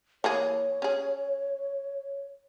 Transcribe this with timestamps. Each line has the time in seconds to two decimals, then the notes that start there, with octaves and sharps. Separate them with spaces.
0.24 E3 A#3 G#4 C#5
0.82 C#4 G#4